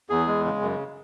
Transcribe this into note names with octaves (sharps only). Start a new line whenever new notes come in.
E2 G#4
G#3
C#3
F#2